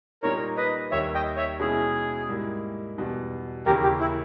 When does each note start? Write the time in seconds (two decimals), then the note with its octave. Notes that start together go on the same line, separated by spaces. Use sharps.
0.23 A#2 G3 A#3 D#4 A#4 C#5
0.57 B4 D#5
0.91 D#2 D#3 G3 C#5 E5
1.15 D#5 G5
1.37 C#5 E5
1.60 B2 G#3 C#4 E4 G#4
2.29 G#2 G3 A#3 E4
2.98 E2 B2 G3
3.66 D#2 C#3 E3 A#3 C#4 G4 A#4
3.83 G4
4.01 E4